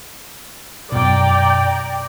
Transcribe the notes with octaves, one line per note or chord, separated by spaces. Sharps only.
F#2 B2 D5 G5 A#5